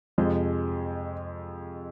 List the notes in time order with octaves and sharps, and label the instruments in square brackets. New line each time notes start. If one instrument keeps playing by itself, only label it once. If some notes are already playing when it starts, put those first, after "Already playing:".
[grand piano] F2 C3 F3 G#3